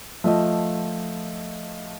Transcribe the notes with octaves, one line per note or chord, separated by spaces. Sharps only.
F3 A3 D#5